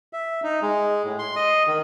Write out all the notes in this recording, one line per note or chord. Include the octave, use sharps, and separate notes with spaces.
E5
D#4
G#3
A2
C6
D#5
D#3